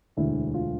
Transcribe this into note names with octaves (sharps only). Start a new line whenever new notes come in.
E1 D2 D3 E4
F4